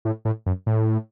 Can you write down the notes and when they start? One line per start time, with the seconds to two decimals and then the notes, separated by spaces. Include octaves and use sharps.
0.05 A2
0.25 A2
0.46 F#2
0.66 A2